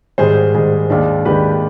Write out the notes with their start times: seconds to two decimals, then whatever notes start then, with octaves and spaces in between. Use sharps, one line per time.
0.18 G#2 D#3 G3 G#4 C5
0.54 G#2 D#3 G3 G#4
0.90 D#2 D#3 G#3 D4
1.25 D#2 D#3 G#3 D4 G4 B4